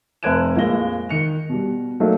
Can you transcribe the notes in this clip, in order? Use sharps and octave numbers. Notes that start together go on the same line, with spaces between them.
F1 C5 F#6 G#6 D7 E7
A#1 F2 G#3 A#3 A#6 G7
D#3 C#7 F7
B2 G3
F#3 A3 A#3 D#4